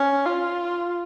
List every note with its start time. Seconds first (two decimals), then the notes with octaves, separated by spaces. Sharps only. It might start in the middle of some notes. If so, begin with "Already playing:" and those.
Already playing: C#4
0.26 F4